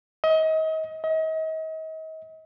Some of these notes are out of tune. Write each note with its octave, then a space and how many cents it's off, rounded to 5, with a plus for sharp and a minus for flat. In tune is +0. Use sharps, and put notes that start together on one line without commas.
D#5 +35
D#5 +40